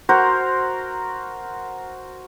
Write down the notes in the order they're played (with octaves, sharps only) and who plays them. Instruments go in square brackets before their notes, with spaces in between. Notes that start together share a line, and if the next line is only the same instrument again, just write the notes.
[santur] F#4 A#4 C5